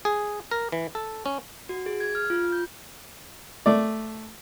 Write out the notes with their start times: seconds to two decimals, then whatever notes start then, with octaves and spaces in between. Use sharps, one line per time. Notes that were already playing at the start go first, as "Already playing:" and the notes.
0.05 G#4
0.51 A#4
0.72 E3
0.95 A4
1.26 C#4
1.69 F#4
1.86 G#4
2.00 G#6
2.15 F6
2.30 F4
2.52 G6
3.66 A3 D5